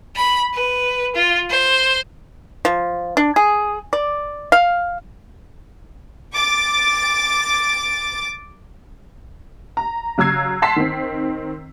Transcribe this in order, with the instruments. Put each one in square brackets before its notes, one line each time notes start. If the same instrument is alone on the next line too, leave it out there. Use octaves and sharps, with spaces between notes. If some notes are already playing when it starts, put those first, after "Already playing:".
[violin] B5
B4
F4
C5
[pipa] F3
D4
G#4
D5
F5
[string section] D6 A6
[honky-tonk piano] A#5
C#3 F#3 A#5 E6 G#6 C7
F#5 A5 C6 B6 C7
D#3 C4